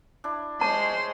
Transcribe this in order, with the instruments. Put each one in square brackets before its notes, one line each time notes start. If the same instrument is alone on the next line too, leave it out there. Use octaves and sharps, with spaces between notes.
[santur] D4 E4
[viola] G#3 [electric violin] C5 C6 [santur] C#5 [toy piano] A5